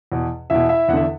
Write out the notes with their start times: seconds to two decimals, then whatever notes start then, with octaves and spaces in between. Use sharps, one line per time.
0.12 E2 B2
0.50 E2 B2 E4 E5
0.69 E4 E5
0.88 E2 F#5
0.93 D3 E5